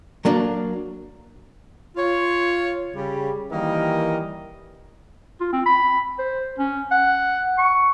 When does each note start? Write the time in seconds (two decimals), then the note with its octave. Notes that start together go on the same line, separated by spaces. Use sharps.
0.25 F#3 A#3 D4 D5
1.97 F4 C#5
2.94 C#3 G3
3.51 D#3 E3 G3 A#3 A#4 D#5
5.41 F4
5.53 C4
5.66 B5
6.19 C5
6.59 C#4
6.91 F#5
7.58 C#6